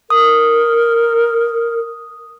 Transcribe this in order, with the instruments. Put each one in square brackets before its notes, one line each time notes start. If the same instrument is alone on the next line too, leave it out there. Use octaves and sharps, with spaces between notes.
[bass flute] A#4 [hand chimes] D#6